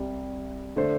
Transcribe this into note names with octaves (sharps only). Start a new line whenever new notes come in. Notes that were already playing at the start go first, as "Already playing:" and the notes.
Already playing: C2 C3 G3
D3 A3 D4 A4 C5